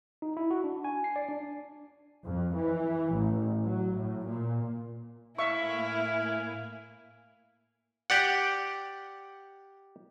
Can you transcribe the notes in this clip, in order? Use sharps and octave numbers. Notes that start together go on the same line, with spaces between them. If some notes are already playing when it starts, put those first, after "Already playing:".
D#4
E4
F#4
D4
G#5
C7
D5
D4
F2
E3
A1
F#3
A2
A#2
A2 A#3 E4 E5 F5 G#5 C#6
F5
G4 D5 F#5